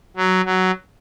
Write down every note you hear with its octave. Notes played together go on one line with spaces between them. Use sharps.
F#3
F#3